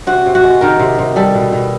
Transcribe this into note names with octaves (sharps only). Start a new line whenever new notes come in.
C3 F#4
C3
F#4
G#3
D#3 A#4
C3
C3
G3 A4
B2
B2